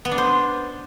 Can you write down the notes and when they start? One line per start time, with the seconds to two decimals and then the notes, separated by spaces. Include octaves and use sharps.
0.05 B3
0.11 D4
0.18 C5